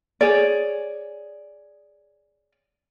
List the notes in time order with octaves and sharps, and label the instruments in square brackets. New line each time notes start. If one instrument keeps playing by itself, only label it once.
[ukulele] G#4 C#5 D5